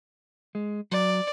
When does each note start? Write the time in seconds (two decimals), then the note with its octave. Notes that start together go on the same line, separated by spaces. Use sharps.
0.55 G#3
0.92 F#3 D5